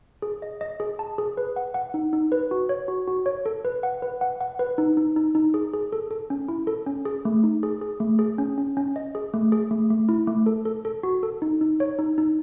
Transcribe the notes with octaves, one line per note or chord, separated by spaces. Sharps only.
G#4
D#5
D#5
G#4
A5
G#4
B4
F#5
F#5
D#4
D#4
B4
F#4
C#5
F#4
F#4
C#5
A4
B4
F#5
B4
F#5
F#5
B4
D#4
D#4
D#4
D#4
G#4
G#4
A4
A4
C#4
E4
A4
C#4
G#4
A3
D#4
G#4
G#4
A3
G#4
C#4
C#4
C#4
D#5
G#4
A3
G#4
A3
A3
E4
A3
A4
A4
A4
F#4
A4
D#4
D#4
C#5
D#4
D#4